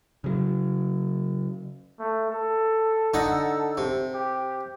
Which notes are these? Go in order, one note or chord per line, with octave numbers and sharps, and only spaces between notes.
C#3 F#3
A3
A4
D3 D#4 F#5
C3
G4